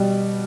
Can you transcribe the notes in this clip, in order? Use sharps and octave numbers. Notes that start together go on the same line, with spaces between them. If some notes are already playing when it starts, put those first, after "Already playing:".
Already playing: B2 G3